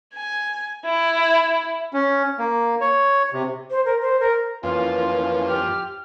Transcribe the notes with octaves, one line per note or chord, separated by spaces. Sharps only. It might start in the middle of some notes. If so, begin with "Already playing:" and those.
G#5
E4
C#4
A#3
C#5
C3
C5
A#4
C5
A#4
F2 E3 A#3 C#4 F4 F5
G4 F6